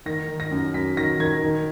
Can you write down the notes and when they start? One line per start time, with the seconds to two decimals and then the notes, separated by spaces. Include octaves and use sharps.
0.06 D#3 A#6
0.28 D#3
0.40 A#6
0.51 F#2
0.74 F#2 B6
0.97 D#3 A#6
1.19 D#3 G#6
1.42 D#3